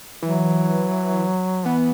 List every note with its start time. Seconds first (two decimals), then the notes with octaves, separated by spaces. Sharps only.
0.22 E3 F#3
1.66 E3 B3